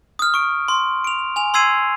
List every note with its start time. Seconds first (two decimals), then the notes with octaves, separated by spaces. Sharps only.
0.19 D#6 F6
0.34 C#6 D7
0.68 C6
1.04 D7 F7
1.36 G#5 F7
1.54 C6 E6 G#6 C7 D#7